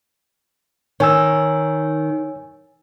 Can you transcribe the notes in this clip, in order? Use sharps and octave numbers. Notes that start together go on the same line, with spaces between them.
D#3 C#5 G#5 E6